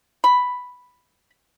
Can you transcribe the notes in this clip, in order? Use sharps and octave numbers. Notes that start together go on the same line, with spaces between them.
B5